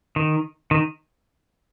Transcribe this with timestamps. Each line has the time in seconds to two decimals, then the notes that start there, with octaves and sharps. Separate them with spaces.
0.16 D#3
0.71 D#3